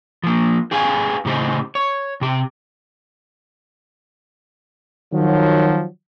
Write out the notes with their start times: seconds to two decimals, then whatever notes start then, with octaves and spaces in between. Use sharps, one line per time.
0.24 F3 A#3
0.71 G4 G#4 B4 F5 F#5 G#5
1.25 A2 C#3 G4 C5 D#5
1.75 C#5
2.21 C3 G4
5.13 D#3 F3 F#3